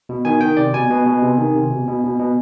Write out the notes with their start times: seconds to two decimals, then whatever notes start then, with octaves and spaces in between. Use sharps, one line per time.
0.09 B2
0.25 D#3 G#5
0.41 D#3 G5
0.57 C3 D5
0.73 B2 G#5
0.90 B2
1.06 B2
1.22 C3
1.38 D#3
1.55 C3
1.71 B2
1.88 B2
2.04 B2
2.19 B2